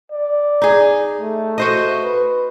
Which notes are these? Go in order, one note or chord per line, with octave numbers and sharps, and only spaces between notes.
D5
D#4 G#4
A3
F#4 C5 D#5
B4